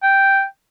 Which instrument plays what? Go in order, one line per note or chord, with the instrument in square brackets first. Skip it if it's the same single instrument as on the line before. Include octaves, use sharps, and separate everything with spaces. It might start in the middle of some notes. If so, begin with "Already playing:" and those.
[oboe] G5